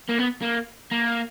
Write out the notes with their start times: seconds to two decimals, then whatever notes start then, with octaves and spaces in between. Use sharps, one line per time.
0.09 A#3
0.19 B3
0.42 A#3
0.91 A#3